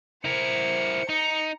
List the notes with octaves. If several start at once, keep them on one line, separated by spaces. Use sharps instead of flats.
E4 A#4 C5 C#7
D#4 A#5 C#7